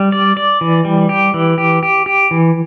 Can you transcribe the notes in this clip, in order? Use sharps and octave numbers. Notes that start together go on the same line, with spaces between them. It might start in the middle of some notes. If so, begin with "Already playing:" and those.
Already playing: G3
D5
D5
E3
G3
G4
E3
G4
G4
G4
E3